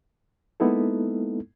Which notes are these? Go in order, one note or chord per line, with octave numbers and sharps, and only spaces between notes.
G#3 A#3 B3 D#4 E4 A4